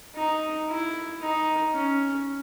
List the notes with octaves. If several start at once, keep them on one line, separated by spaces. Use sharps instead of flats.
D#4
E4
D#4
C#4